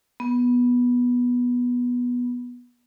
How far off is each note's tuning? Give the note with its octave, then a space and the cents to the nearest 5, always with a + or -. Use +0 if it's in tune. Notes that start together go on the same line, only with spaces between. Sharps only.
B3 -10